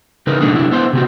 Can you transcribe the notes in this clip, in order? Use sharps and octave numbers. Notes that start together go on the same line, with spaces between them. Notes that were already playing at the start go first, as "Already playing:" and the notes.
C#3 D#4 A#4 B4
B2 F#3 A3 D4 D#4
C2 D4 E4
B3 E4 C5
C3 C4 F#4